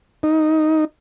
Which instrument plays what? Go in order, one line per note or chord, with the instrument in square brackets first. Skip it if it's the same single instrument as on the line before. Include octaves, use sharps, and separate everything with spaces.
[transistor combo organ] D#4